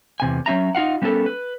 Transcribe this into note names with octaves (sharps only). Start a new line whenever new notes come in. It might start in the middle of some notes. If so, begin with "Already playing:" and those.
E2 C3 G#5
F#3 C#4 D#4 E5 A#5
D#4 F4 F5 F#5
G3 B3 C#4 D#4 A4 A#4
B4